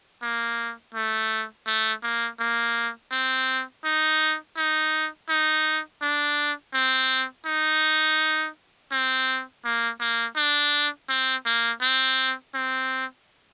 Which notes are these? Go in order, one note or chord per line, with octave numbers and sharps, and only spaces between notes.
A#3
A3
A3
A#3
A#3
C4
D#4
D#4
D#4
D4
C4
D#4
C4
A#3
A#3
D4
C4
A#3
C4
C4